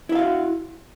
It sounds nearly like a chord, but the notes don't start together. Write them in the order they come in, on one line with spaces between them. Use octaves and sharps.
E4 E5 F5 F#4